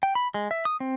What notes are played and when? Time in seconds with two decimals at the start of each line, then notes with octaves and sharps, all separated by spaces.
0.03 G5
0.15 B5
0.34 G#3
0.51 E5
0.65 D#6
0.80 C4